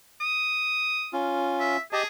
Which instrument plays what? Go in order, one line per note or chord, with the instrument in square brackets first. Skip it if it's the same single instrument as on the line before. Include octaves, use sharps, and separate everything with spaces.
[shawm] D#6
[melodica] C#4 F4
[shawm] E5
[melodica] G4 D#5 A5 [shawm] G#4